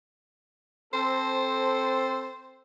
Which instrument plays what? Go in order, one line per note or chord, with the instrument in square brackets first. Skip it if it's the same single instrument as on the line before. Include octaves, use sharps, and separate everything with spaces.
[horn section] C4 A4 [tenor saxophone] C5